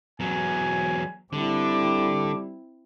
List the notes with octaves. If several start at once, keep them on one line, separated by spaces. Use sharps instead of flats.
E2 F#3 G#5
D3 G3 C4 E4 D6